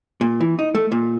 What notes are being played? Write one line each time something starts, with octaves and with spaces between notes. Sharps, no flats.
A#2
E3
D#4
A3
A#2